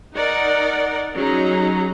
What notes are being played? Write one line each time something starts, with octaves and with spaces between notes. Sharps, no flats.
D#4 A#4 D5 F#5
F#3 C#4 D#4 G#4 A#5